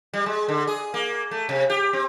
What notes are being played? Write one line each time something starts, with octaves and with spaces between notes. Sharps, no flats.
G3
G#3
D3
G#4
A#3
A3
C3
G4
C4